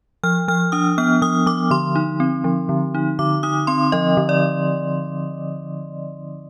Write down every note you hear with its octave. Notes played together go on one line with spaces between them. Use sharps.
F3 F6
F3 F6
D4 D#6
B3 F6
F3 D#6
F3 D6
D3 C6
D#4
C4
F3
D3
D#4
D3 D6
D#4 D#6
C4 C6
F3 D#5
D3
D5